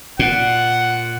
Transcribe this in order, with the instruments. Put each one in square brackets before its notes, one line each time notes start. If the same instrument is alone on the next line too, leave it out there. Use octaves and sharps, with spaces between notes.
[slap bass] A#2 [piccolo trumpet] F#5